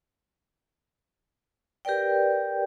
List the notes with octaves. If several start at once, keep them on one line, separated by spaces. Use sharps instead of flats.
G4 A#4 B4 D5 G5